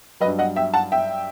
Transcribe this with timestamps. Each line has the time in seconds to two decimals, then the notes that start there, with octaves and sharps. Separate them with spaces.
0.20 F#3 B4 D#5
0.26 G2
0.39 D#5 F#5
0.56 E5 G5
0.74 F#5 A5
0.92 E5 G5